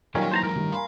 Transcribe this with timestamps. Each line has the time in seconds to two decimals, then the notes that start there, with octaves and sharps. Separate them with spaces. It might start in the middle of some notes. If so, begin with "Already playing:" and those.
0.15 A#2 D#3 F#3 G3 C#4 C#5
0.32 D#3 E3 A#3 C5 A5 A#5
0.43 F#3 G#3 A#4
0.56 A1 G2 D#3 G3
0.72 F5 G#5 B5 C6